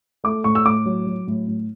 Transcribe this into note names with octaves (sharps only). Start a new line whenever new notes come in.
A3 D6
A2 C#6
E6
A2 D6
F#3
F#3
A2
A2